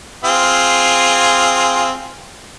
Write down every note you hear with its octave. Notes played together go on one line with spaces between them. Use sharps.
C4 F4 G#4